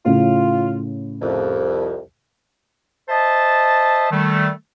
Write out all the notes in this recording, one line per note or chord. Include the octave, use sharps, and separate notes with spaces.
A2 C#3 F4
C2 F2
C5 D#5 E5 A5
D#3 G3 A3